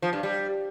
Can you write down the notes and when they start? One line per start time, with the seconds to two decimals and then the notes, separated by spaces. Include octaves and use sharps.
0.02 F3
0.13 G2
0.23 G3